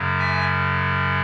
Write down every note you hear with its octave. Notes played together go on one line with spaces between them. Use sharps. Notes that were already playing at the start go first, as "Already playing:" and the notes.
Already playing: F#2 C#3 F#3
E5 G#5